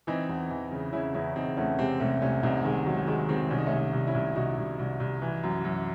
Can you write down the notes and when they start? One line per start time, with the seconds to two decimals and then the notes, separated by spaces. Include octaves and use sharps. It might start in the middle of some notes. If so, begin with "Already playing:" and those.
0.07 E3 C4 D#4
0.29 E2
0.50 E3
0.71 C#3
0.93 C#3 C#4 E4
1.14 E2 C#4 E4
1.36 E2 C4 D#4
1.57 E2 A3 C#4
1.79 C3 G#3 C4
2.00 C2 A3 C#4
2.22 C2 A3 C#4
2.43 C2 C4 D#4
2.65 D#3 G#3
2.86 D#3 F#3
2.99 F#3
3.07 D#3 G#3
3.29 D#3 G#3 C4
3.50 C2 C#4
3.58 D#4
3.66 A3 C#4
3.72 C3
3.78 A3 C#4
3.93 C2
4.07 C#4 E4
4.15 C2
4.36 C2 D#4 F#4
4.57 C2
4.79 C2
5.00 C2
5.22 E3
5.43 F#2
5.65 F#2